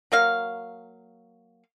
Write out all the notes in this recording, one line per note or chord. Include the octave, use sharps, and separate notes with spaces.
F#3 A#3 F5